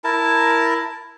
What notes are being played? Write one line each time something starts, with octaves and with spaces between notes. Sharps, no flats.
E4 A#4 A5